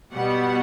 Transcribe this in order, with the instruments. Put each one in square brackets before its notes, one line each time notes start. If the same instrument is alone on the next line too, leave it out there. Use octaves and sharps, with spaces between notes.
[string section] B2 G3 B3 F#5